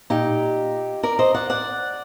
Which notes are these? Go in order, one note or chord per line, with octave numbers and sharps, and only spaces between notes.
A#2 D#4 G4
A#4 D5
C5 D#5
D5 F#5
D5 F#5